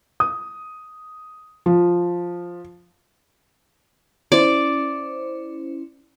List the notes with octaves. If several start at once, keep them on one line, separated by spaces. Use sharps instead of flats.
D#6
F3
C#4 E4 C5 D5